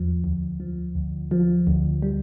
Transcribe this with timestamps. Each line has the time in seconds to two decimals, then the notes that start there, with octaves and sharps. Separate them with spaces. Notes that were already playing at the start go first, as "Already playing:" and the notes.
Already playing: E2 F3
0.24 D2
0.60 F3
0.95 D2
1.31 F3
1.67 D2
2.02 G3